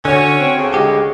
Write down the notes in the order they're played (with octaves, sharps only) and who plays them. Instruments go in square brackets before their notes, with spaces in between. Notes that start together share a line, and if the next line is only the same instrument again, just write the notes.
[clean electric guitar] D3 [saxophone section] C#4 F#4 C#5
[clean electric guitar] C4
[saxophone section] D2 C#3
[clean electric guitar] D3 G#3 G4